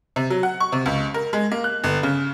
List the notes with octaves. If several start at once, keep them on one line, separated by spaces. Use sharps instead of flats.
C3
F#3
F#5
C#6
C3
C#2
A#4
G#3
A#3
F#6
G1
C#3